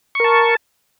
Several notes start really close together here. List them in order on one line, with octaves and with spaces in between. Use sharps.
C#6 A#4 A5